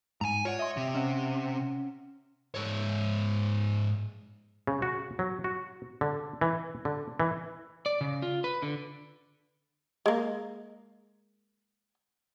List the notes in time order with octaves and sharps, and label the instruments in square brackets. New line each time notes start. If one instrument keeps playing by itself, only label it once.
[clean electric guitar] G#2 [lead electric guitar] G#5 A#5
[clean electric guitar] F4 D5 F#5 [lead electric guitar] C#5
[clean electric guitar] D#5 [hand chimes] E5 C6
[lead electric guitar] C3
[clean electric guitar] C#4 F#5
[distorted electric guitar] G#2 C#5
[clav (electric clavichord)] C#3
F#4
F#3
F#4
D3
E3
D3
E3
[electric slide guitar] D5
C#3
F4
B4
D3
[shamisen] G#3 A#3